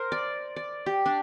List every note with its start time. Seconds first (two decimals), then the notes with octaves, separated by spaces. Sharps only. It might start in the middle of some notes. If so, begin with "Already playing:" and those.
Already playing: A#4 C5
0.12 D5
0.56 D5
0.86 G4
1.06 D4